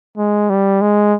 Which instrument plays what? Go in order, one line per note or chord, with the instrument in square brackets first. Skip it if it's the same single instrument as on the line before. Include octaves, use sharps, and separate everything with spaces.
[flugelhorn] G#3
G3
G#3